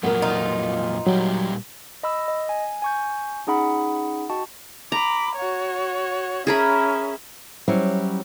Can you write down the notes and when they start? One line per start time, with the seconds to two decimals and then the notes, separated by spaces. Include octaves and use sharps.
0.03 F2 A#2 F#3 B3 A#4
0.22 D#4 F4
1.07 A#2 F#3 G3 G4
2.03 D#5 B5 E6
2.28 D#5
2.49 G#5
2.82 G#5 C#6 G6
3.47 C#4 D#4 G#4 F#5 B5
4.30 F#4 D#5 G5 A5 C#6
4.92 A#5 B5 D6
5.36 F#4 C#5
6.47 C#4 G#4 A#4 E5 B5
7.68 F#3 G3 C#4 E4 C5